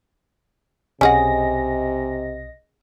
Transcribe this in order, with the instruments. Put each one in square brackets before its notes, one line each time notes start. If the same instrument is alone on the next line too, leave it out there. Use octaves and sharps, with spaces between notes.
[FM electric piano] B1 D#5 A#6 [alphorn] C3 [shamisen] C#4 G#4 F#5 [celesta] G#5